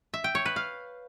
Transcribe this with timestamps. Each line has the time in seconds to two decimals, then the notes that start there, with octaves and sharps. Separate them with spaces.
0.14 E5
0.24 G5
0.35 C#5
0.46 B4
0.56 F5